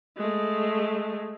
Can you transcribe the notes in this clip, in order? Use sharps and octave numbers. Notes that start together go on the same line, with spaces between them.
G#3 A3